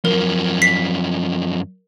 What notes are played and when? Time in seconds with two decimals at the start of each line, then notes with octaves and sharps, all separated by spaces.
0.05 F#2 F3 A#4
0.62 B6 C7